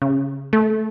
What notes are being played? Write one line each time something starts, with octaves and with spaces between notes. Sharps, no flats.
C#3
A3